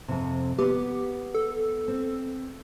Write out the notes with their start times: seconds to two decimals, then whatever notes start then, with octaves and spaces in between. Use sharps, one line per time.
0.08 F2 C3
0.59 B3 G4
1.34 A4
1.88 C4